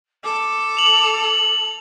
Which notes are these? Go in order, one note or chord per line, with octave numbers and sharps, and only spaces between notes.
A4 D6
F7 F#7